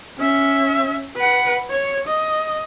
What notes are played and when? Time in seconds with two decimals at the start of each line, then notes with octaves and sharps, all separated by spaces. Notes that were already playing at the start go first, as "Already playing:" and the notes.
0.18 C#4 E5
1.16 B4 F#5
1.71 C#5
2.08 D#5